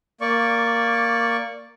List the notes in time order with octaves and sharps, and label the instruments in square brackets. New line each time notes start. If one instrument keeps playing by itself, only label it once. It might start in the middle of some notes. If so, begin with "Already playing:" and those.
[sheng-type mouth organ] A#3 D5 C#6